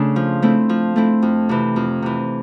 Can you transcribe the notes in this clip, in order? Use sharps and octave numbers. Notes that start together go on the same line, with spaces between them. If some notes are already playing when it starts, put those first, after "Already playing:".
Already playing: C#3 A3 D4
F3
A3 C4 E4
F3
A3 C4 E4
F2
C3 E3
F2
C3 E3